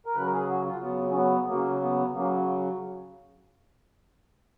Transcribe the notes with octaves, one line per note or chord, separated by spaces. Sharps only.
A#4
C#3 F#3 B4
A#4
G#4
F#4
F4
C#3 F#3 B3
C#4
B3
C#3 F#3 A#3
B3
C#3 F#3 A#3